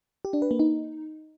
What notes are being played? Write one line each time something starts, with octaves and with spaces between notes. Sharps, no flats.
G4
D4
B4
A#3
D#4